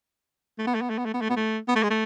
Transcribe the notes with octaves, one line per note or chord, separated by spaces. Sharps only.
A3
B3
A3
B3
A3
B3
A3
B3
A3
B3
A3
B3
A3
G#3
A3